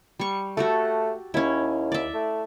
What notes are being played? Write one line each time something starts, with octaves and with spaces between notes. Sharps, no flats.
G3 C#6
A3 F#4 G4 A4
D#2 C#4 E4
D5 E5
A3